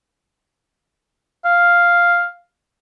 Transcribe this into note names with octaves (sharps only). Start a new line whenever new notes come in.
F5